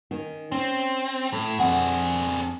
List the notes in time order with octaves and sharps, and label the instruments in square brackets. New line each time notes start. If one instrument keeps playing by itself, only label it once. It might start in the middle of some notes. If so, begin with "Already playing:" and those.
[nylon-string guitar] D#3 C#4
[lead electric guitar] C4 [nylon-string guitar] C#4
[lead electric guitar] A2 [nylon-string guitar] A3
[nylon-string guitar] F2 C4 F#5 [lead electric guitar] D4 G#4